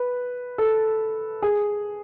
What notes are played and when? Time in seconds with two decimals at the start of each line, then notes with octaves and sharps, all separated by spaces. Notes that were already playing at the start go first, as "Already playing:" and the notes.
Already playing: B4
0.58 A4
1.42 G#4